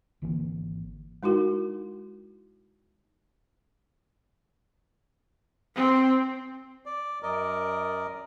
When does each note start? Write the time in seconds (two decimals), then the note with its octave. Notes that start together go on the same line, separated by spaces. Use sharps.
0.22 G#1 D3 E3 A#3
1.23 G#3 D#4 E4 F#4 A#4
5.76 C4
6.86 D5
7.23 F#2 A#4 D5 D#5